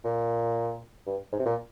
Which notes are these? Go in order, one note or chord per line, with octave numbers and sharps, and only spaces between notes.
A#2
G2
G#2
C3
A#2